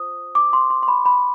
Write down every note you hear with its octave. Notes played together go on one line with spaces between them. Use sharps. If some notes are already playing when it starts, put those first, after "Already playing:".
Already playing: F4 C5 D#6
D6
C6
C6
C6
B5
B5